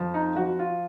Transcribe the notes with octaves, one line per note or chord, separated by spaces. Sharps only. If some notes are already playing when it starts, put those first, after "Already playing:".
Already playing: F2 F3
D#4
F3 F#4
F4